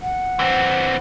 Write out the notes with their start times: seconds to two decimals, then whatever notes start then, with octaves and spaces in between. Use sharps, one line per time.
0.02 F#5
0.39 E3 C4